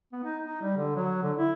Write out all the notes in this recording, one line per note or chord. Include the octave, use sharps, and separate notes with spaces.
B3
D#4
D#4
G3
D3
F#3
D3
E4